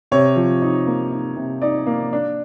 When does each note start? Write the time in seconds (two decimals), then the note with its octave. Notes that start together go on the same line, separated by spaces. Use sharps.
0.12 C3 C#5
0.36 F3
0.62 D#4
0.87 A#3
1.12 D#4
1.36 C3
1.62 D#4 D5
1.87 A#3
2.13 D4